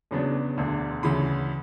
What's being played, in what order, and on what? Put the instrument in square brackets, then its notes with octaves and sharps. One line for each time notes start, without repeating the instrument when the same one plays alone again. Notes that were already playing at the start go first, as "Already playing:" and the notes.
[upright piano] E2 C#3 F#3 B3 D4
E1 D2 D3
D2 C#3 E3 B5